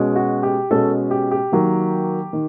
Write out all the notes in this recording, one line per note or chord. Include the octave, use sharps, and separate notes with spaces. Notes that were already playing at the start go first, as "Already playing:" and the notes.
Already playing: B2 G#3 C#4
F#4
G4
B2 G#3 C#4 A4
G4
G4
D#3 F#3 A#3
D#3